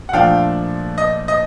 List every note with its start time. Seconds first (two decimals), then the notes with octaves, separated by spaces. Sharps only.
0.09 F#5
0.13 A#2 F3 A3 D4 F5 G5
0.98 D#5
1.28 D#5